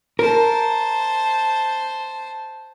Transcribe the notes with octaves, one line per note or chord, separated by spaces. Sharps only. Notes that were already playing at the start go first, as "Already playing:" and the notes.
A#4 C5 A5